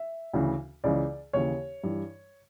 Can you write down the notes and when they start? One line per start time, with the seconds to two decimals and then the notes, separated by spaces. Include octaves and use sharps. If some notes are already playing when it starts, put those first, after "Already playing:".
Already playing: E5
0.33 D2 C#3 E3
0.84 C#2 C#3 E3 D5
1.33 D#2 C#3 E3 C#5
1.84 G2 E3